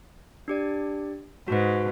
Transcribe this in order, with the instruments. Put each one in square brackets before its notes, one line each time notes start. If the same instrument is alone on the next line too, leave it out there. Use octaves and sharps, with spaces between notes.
[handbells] D4 G4 D5
[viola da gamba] G#2 [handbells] F#4 B4